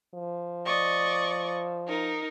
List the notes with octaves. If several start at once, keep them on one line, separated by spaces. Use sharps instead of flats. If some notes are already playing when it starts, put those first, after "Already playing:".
F3
D5 D#5 C#6
D#4 A#4